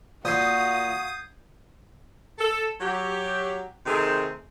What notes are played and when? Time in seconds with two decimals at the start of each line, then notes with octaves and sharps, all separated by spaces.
0.25 A#2 F#4 F5 D#6 G6 G#6 C7
2.38 A4
2.80 F#3 G4
3.86 C3 D#3 A3 C4 D#4 G#4